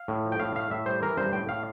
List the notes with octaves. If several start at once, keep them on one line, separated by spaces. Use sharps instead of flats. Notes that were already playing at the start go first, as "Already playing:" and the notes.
Already playing: F5
A2
F3
G5
A2 F5
A3 F5
A2 E5
G3 C5
E3 A#4
G2 C5
A2 G5
A2 F5